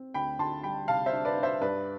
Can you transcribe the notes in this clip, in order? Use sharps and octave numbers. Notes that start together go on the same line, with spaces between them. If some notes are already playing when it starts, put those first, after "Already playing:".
Already playing: C4
D2 G5 B5
D2 A5 C6
G3 G5 B5
C3 F5 A5
C5 E5
D4
B4 D5
D4
C5 E5
G2 B4 D5